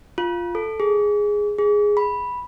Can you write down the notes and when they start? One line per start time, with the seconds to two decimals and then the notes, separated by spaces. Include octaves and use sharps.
0.18 F4
0.55 A4
0.80 G#4
1.59 G#4
1.97 B5